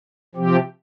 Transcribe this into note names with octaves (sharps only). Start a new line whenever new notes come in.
C3 F3 C4 G4